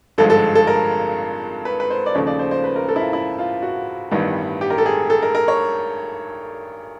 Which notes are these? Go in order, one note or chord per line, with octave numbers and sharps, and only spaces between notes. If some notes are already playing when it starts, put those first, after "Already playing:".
G#1 G2 D3 F3 G#3 A4
A4
A4
A#4
B4
B4
C5
D5
D#2 C#3 F3 A3 C#5
D5
C5
C5
B4
A#4
A4
E4
F4
E4
F4
F#4
A1 G2 D#3 G3 B3
G4
A#4
A4
G#4
A4
A#4
A#4
C#5